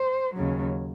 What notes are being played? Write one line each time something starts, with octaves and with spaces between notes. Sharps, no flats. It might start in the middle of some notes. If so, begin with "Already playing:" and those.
Already playing: C5
D#2 C#3 F#3